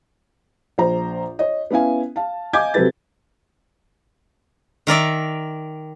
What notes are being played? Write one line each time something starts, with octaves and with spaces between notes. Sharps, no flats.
A#1 C5 A#5
C#5 D#5
B3 C#4 E4 F5 G#5
F5 A5
D#5 F5 G#5 D6 G6 G#6
C3 F#3 C4 A4 B4 A6
D#3 A#4 D5 E5